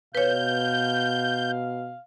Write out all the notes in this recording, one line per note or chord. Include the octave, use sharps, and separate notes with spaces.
B2 B4 C#5 F5 G6